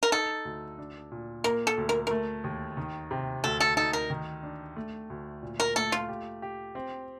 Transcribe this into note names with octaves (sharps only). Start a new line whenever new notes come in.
A#4
D#4 A4
D2
D4
A#2
A#3 A#4
A4
D2
A#4
A3 A#4
D#2
D#3
C3
D2 A4
A4
D#4 A4
A#4
D#3
D4
A3
D2
A#2
A#4
A3 A4
F4
G4
G4
C4